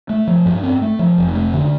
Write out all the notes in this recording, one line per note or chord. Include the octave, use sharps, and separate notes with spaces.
A3
F3
G2
C4
A3
F3
F1
A3
D3